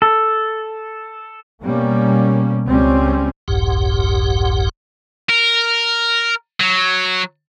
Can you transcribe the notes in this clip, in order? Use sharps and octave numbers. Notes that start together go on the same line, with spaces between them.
A4
B2 G3 A#3 C#4
C#2 G3 C4 C#4
F#1 C2 F2 G#2 G4 F#5
A#4
F#3